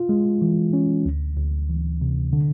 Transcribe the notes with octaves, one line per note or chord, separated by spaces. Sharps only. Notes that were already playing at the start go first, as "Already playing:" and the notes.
Already playing: F4
G#3
E3
C#4
D2
D2
E3
C3
D3